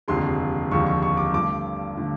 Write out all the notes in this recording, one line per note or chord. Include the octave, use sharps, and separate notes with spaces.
F1 D#2 D3 F3 G#3 C6
F1 D#2 D3 F3 G#3 C#6
C#6
C#6
D6
G2 D3 F3 A3 D6
D3 F3 A3